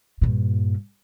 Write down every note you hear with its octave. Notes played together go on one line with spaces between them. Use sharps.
G2 A#2